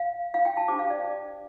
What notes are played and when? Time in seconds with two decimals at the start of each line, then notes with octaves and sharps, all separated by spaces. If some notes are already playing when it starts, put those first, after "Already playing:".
Already playing: F5
0.34 F5
0.45 G5
0.57 A5
0.68 D4 G4 C5 D6
0.79 F5
0.90 D5